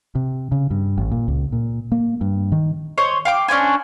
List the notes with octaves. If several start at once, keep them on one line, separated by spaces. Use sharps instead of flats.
C3
C#3
G2
A1
A#2
C#2
A#2
A#3
G2
D#3
C5 C#5 D#5
F5 G5 D6
C#4 D4 C5 G#5